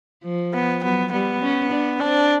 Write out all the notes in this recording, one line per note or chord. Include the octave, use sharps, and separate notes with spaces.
F3
B3
F#3 B3
G3 B3
C#4
D4
C4 D4